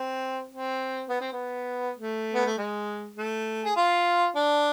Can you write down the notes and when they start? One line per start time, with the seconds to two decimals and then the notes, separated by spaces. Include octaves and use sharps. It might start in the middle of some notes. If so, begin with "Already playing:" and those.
Already playing: C4
0.51 C4
1.09 B3
1.20 C4
1.32 B3
1.98 A3
2.34 B3
2.46 A3
2.58 G#3
3.16 A3
3.65 G#4
3.76 F4
4.35 D4